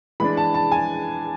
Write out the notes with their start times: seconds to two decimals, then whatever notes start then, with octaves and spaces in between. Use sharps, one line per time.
0.20 E3 G#3 D4 B5
0.37 A5
0.54 A5
0.72 G#5